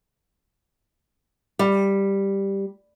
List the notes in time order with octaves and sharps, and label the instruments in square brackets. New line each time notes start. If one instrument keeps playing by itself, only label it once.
[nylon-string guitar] G3